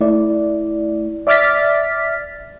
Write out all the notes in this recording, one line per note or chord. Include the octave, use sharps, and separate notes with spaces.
A3 E4 D5
D5 E5 D6 F6 A6 B6